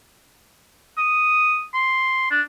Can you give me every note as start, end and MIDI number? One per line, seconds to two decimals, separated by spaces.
0.97 1.64 87
1.74 2.28 84
2.31 2.41 62